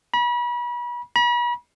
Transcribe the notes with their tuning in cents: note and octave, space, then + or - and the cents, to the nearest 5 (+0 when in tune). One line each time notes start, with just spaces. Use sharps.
B5 -35
B5 -40